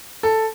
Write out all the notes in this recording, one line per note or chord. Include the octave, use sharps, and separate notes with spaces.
A4